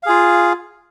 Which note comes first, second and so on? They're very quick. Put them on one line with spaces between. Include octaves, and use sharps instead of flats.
F5 G#4 F4